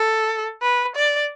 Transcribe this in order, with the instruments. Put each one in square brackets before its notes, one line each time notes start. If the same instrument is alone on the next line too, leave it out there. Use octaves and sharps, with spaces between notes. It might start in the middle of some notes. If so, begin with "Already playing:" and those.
Already playing: [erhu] A4
B4
D5